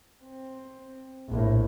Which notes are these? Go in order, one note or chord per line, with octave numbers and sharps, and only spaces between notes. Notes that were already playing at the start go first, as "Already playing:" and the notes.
C4
A#1 A2